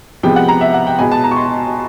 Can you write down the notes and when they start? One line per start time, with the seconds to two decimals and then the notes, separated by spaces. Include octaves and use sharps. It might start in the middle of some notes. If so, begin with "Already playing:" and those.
0.23 C3 F3 G#3 B3 G5
0.36 F#5
0.48 A#5
0.61 E5
0.74 F#5
0.87 G5
0.99 B2 G#3 B3 G#5
1.12 A5
1.24 A#5
1.31 C#6
1.36 C6